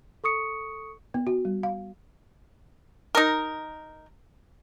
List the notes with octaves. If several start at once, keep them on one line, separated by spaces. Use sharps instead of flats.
A4 C#6 D#6 C#7
B3
F#4
G3
F5
D#4 A#4